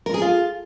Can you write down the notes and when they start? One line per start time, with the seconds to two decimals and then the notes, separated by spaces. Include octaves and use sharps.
0.06 A#4
0.14 G#4
0.22 F4